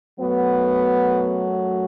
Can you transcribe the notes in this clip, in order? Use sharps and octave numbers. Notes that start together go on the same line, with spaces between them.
F#2 F#3 A3 B3